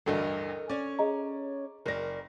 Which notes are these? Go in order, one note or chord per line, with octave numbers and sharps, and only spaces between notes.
A1 D2 G2 A4 A#4 D#5
C#4 C#5 D5
G#4 D#5 A#5
F#1 A#4 D5 A#6